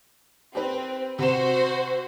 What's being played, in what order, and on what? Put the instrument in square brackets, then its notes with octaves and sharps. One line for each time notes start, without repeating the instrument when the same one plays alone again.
[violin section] C4 [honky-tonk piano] G4 B4
[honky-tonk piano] C3 E7 [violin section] F#4 C5